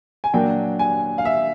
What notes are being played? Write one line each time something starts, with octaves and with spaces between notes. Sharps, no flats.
G#5
A#2 F#3 A#3 D4 G5
G#5
F5
E5